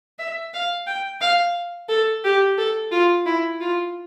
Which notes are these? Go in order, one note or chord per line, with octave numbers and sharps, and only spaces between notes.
E5
F5
G5
F5
A4
G4
A4
F4
E4
F4